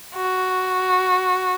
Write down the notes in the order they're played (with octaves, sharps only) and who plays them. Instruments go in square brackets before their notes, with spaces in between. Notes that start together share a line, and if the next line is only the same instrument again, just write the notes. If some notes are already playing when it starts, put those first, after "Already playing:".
[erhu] F#4